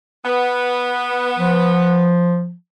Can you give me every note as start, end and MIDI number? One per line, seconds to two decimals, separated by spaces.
0.25 2.16 59
1.39 2.54 53